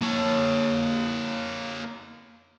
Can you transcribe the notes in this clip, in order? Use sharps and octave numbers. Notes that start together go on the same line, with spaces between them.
A#3 C#5